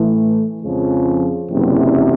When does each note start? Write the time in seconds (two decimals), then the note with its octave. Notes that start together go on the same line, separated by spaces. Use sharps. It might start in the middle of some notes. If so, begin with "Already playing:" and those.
Already playing: A2 E3 A3
0.60 F2 C#3 F3 G#3
1.50 F#1 E2 C3